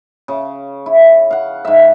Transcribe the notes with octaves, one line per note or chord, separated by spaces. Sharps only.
C#3
E4
F5 F#5
G#2 E5